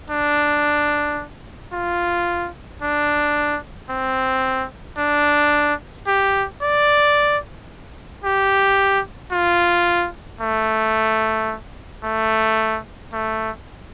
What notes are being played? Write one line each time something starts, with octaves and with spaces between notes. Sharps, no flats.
D4
F4
D4
C4
D4
G4
D5
G4
F4
A3
A3
A3